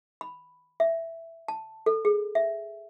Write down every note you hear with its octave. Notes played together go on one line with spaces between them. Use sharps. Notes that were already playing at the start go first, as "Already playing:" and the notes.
B5
E5
A5
A4
G#4
E5